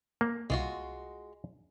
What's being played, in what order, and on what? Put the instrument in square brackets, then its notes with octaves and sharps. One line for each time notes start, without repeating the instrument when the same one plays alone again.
[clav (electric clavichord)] A#3
[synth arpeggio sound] C2 [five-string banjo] G#3 F4 F#4